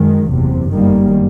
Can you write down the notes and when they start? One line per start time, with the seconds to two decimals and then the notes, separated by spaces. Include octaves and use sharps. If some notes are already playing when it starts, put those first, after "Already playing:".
Already playing: F#2 D#3 G#3
0.30 F#1 E2 C3
0.70 G1 F#2 D#3 G3 A#3